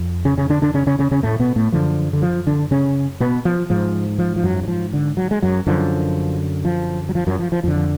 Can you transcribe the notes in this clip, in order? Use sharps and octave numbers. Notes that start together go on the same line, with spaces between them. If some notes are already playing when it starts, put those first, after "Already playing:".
Already playing: F2
C#3 C#4
C#3 C#4
D3 D4
D3 D4
C#3 C#4
C#3 C#4
C#3 C#4
C#3 C#4
A2 A3
B2 B3
A2 A3
F#2 D3 F3
D3
F3
D3 D4
C#3 C#4
B2 B3
F3
G#2 F3
F3
F3
F#2 F#3
F#3
F3
D3
F#3
G#3
F#2 F#3
F#2 D3 F3
F3
F#3
F3
F#2 F#3
F3
F3
F2 D3 F3
F3